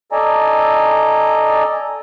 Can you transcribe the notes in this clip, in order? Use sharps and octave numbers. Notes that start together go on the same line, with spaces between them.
A4 D5 D#5 G#5 A#5